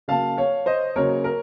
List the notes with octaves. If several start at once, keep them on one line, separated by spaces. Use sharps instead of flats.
C#3 F#3 A#3 F5 A5
C#5 F5
C5 D#5
C#3 F#3 A#3 A#4 C#5
A#4